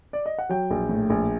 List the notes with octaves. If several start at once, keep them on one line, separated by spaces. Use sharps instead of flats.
D5
D#5
F#5
F#3 G5
A#1
A2
A#1